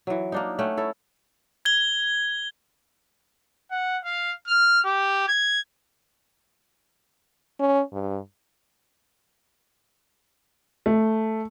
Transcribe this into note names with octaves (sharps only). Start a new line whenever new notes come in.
E3 F#3
A#3 D4 D#4
A3 C#4 F#5 G5
E4 A4 C#5
G#6 G7
F#5
F5
F6
G4
G#6
C#4
G2
A3